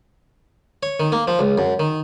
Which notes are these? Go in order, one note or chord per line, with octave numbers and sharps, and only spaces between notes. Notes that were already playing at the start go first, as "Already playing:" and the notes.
C#5
D#3
A#3
F3
C#2
F#2
D#3